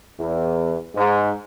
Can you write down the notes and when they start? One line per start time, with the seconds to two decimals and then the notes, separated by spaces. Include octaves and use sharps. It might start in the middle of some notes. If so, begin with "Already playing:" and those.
0.17 E2
0.95 G#2